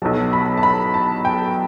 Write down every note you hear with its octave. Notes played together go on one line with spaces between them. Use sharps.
B1 B2 F#3 A5
B5
A5
B5
A5
G5